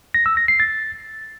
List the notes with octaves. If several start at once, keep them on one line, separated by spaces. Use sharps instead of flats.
A#6
E6
A#6
C7
A6